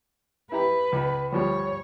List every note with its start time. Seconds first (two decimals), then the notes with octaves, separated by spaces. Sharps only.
0.52 E4 G4 B4 A#5
0.92 C#2
1.32 D2 F3 G3 C#5